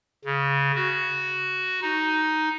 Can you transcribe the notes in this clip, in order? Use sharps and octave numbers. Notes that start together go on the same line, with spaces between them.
C#3
F#4
D#4